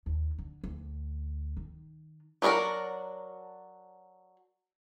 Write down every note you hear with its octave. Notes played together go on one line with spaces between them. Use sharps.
D#2
D3
D2
D#3
F#3 D4 E4 F#4 A#4